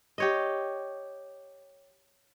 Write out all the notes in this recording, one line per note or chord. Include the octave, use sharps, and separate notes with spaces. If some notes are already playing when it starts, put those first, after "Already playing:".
G4 C#5 D#5